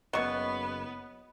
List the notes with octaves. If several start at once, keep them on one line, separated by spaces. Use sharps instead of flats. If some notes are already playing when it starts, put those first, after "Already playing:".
F#1 F#3 B3 B4 D#5 C#6